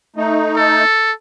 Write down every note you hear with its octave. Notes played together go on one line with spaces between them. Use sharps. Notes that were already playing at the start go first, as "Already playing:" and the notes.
A3 D#4
A4